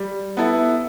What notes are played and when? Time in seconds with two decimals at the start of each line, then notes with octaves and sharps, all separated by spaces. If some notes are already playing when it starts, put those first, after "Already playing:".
Already playing: G3
0.37 B3 E4 A4